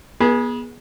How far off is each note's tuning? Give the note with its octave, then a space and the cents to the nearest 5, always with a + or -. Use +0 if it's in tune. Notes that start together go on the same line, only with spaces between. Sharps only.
B3 -35 G#4 +0